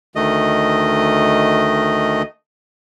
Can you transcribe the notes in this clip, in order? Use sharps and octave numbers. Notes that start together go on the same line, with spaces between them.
D2 D#3 A3 D#5